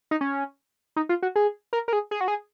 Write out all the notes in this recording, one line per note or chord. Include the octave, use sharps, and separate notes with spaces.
D#4
C#4
D#4
F4
F#4
G#4
A#4
A#4
G#4
G#4
F#4
G#4